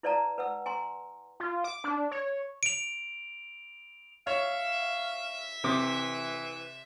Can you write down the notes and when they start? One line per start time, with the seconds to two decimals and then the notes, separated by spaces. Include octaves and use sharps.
0.03 E4 B4 D5 F5 A5 A#5
0.38 B4 F#5 E6
0.66 G#5 A#5 C6
1.40 F4
1.64 D6
1.84 D4
2.11 C#5
2.63 D7 F7
4.27 C#5 E5 F5
5.64 C3 E3 D6